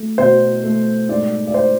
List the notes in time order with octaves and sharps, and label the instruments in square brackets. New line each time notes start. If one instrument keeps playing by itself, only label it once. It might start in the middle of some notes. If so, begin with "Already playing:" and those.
Already playing: [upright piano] A3
B2 C5
A3
G#2 D5
D5
C5